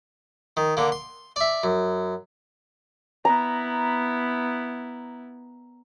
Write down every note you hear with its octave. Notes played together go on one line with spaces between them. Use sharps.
D#3
D3 A#3
C6
D5 E5
F#2
B3 E4 A#5